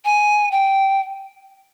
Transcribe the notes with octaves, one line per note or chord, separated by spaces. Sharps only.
G#5
G5